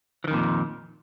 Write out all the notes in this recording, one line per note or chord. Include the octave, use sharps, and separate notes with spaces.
F2 A#2 D#3 E3